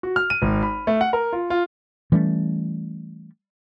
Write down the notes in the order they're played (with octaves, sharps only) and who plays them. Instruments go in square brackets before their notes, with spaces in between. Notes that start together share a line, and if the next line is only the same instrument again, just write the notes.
[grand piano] F#4
F6
D#7
G#1
B5
A3
F#5
A#4
F4
F4
[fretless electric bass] E3 G3 A3 C#4